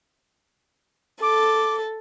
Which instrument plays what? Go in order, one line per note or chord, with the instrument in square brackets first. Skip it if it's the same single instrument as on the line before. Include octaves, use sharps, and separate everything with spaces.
[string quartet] A4 [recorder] D6